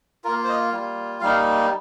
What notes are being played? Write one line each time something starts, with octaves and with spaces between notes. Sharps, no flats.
A#3 F4 A#4
C5
D#5
G3 A#3 F4
G3 A#3 D#4 F5